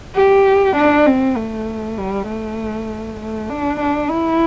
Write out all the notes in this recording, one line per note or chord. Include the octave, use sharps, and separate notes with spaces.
G4
D4
C4
A3
G3
A3
A3
D4
D4
E4